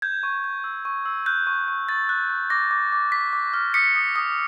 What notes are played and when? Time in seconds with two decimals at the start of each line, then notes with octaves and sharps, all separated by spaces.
0.02 G6 G#6
0.23 C#6
0.44 G6
0.64 E6
0.85 C#6
1.05 E6
1.26 F#6 G6
1.47 C#6
1.68 C#6
1.89 C#6 A6
2.09 F#6
2.30 C#6
2.50 D6 A#6
2.71 D6
2.92 D6
3.12 D6 B6
3.33 D6
3.54 F6
3.74 D#6 B6 C#7
3.96 D#6
4.16 D#6